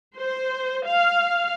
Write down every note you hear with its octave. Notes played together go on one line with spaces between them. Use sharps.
C5
F5